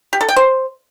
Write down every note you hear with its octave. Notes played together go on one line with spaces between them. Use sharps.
G4
A4
G5
C5